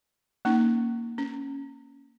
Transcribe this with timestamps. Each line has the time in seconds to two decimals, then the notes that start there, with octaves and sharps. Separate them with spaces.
0.45 A#3 C#4 D#4
1.18 C#4